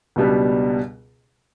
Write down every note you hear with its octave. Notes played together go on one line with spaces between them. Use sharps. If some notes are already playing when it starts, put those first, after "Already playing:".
C#2 B2 G3 B3 D4